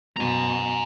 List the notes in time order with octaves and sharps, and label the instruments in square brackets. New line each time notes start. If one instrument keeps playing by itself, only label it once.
[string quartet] F#2 B2 [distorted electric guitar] G#5 A#5